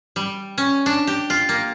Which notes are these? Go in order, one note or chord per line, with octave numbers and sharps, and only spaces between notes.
G3
C#4
D4
G4
F4
A#3